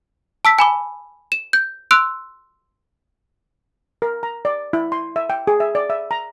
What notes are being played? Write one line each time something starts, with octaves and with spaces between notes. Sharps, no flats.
A5 E6 B6
G#5 B5 D6
E7
G6
C6 E6 F#6 D7
A#4
A#5
D5
E4
C6
E5
G5
G#4
E5
D5
E5
A#5